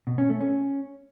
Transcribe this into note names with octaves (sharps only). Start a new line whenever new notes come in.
B2
C#4
A3
C#4